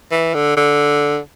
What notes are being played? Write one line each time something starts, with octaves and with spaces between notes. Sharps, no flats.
E3
D3
D3